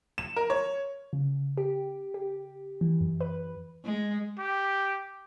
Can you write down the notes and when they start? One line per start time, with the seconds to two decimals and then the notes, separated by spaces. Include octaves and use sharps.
0.18 E7
0.36 A#4
0.50 C#5
1.13 C#3
1.57 G4
2.14 G4
2.81 E3
3.01 F#2
3.21 B4
3.84 G#3
4.39 G4